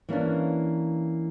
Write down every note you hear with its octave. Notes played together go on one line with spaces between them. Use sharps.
E3 A#3 C#4 D4